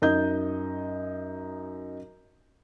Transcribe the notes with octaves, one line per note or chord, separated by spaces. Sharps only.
F#2 D#4 D#5 G6